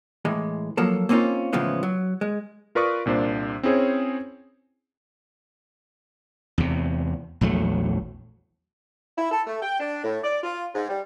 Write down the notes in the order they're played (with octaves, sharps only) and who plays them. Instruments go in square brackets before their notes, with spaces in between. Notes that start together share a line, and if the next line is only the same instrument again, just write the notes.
[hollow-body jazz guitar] A2 E3 G#3
F3 F#3 A#3 A4
A#3 C4 C#4 D#4 F4
A2 C#3 E3 F3 G#3 B3
F#3
G#3
[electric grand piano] F4 A#4 B4 D5 C#6 D#6
C2 A#2 D4 C5 D5
C4 C#4 E4 G#4 C5 C#5
[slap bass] E2 C3
A#1 E2 F#3 A3
[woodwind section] E4
A4
A3
G5
D4
A2
D5
F4
G#2
G3